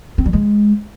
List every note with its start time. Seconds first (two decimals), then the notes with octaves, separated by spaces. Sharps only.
0.18 C4
0.26 G3
0.33 G#3